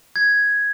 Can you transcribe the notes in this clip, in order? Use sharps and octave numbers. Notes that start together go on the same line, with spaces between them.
G#6